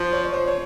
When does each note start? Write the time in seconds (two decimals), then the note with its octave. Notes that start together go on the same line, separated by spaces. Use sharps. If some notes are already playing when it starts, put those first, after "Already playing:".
Already playing: F3
0.13 C#5
0.25 C#5
0.33 C5
0.47 C#5